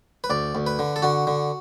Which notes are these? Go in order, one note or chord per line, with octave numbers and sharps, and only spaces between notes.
B4
D2 D5
D2
B4
D3
A4
D3 F#4
D3